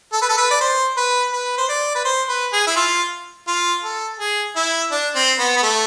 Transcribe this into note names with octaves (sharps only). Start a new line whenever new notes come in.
A4
B4
A4
B4
D5
C5
B4
B4
C5
D5
B4
C5
B4
G#4
E4
F4
F4
A4
G#4
E4
D4
C4
B3
B3
A3